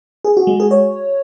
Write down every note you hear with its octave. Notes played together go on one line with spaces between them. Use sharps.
G#4
F#4
G#3
G#4
C#5